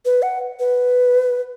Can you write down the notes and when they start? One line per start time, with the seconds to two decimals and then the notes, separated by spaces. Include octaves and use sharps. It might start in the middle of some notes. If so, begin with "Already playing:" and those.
0.05 B4
0.22 F#5
0.60 B4